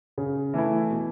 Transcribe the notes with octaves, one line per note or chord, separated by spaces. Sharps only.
C#3
E3 A3 E4
B2